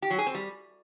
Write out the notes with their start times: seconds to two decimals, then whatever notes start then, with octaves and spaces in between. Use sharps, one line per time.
0.02 G4
0.10 F#3
0.19 G#4
0.27 C4
0.35 G3